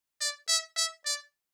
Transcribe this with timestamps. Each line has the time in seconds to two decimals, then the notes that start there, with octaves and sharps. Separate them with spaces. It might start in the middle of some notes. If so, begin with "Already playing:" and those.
0.21 D5
0.48 E5
0.77 E5
1.06 D5